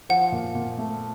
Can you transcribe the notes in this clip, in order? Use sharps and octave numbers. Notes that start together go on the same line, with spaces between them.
F3 F#5
A#2
A#2
A3